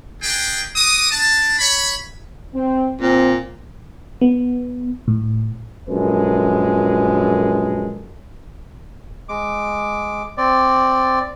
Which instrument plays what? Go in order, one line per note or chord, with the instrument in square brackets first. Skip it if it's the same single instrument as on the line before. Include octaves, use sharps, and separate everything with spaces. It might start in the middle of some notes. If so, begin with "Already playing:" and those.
[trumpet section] G#3 D4 G#4 B4 G5
F#4 D6 D#6
D4 A5
C#5 B5
[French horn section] C4
[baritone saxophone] A#2 [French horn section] C4
[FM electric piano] B3
A2
[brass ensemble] A#1 F#2 G#3 A4 B4
[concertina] G#3 D6
C4 D5